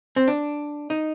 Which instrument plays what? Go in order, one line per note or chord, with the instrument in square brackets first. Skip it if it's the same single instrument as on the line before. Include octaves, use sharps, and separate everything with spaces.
[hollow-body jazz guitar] C4
D4
D#4